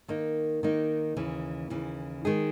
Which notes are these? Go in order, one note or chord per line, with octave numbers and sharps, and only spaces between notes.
D#3 A#3 D#4
D#3 A#3 D#4
D#2 C#3 E3
D#2 C#3 E3
D#3 G#3 D#4 G#4